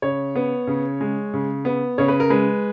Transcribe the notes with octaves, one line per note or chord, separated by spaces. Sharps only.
C#3 C#5
B3
C#3
G#3
C#3
B3
C#3 C#5
B4
A#4
G#3 B4